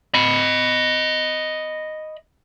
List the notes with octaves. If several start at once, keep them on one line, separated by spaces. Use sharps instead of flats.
D#5 B5